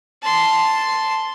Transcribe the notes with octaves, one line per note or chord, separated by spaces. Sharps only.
A5 C6